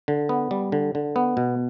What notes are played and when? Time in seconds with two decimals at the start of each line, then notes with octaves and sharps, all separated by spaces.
0.08 D3
0.29 B3
0.51 G3
0.72 D3
0.95 D3
1.16 B3
1.37 B2